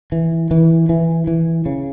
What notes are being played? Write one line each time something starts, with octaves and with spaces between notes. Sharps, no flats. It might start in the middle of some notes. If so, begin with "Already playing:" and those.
E3
E3
E3
E3
C#3